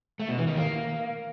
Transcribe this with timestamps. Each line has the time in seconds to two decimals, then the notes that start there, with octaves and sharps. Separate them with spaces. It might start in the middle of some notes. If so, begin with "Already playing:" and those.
0.20 A3
0.29 B2
0.38 E3
0.47 D#3
0.56 A#3